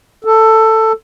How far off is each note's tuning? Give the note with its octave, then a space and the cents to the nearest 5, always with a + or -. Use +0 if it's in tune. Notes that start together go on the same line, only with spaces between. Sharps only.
A4 +10